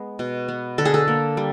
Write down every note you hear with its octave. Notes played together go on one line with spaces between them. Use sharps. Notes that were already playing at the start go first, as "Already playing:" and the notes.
Already playing: G#3 B3
B2
B3
D3 A4
G#4
A4
A#3
G3